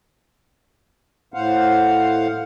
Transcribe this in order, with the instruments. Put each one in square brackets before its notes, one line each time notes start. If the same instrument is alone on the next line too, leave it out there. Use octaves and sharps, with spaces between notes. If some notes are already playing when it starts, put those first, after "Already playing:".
[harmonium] A2 C5 F5 F#5